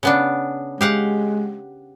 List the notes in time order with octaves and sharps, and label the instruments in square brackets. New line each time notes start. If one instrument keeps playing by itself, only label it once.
[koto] C#3 B3 D4
[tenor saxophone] G#3 [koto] G4 F5 F#5